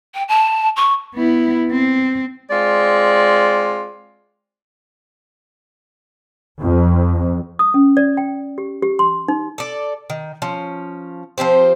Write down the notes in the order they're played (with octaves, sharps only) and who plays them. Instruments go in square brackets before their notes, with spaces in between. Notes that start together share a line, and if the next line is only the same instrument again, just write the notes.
[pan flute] G5
A5
C#6
[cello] B3 E4
C4
[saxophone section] G#3 C4 F4 D5
[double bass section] F2
[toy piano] D#6
C#4
D5
G5
G4
G4
C6
D#4
[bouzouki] A4 D5
D#3
F3 C#4
F3 C4 G4 C5